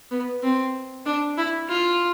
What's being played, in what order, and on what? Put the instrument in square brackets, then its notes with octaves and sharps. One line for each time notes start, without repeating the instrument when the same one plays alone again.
[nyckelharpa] B3
C4
D4
E4
F4